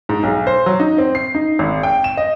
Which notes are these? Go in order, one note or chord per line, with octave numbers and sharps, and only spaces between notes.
G#2
B1
C5
F#3
D#4
C4
C7
D#4
G#1
G5
E7
D#5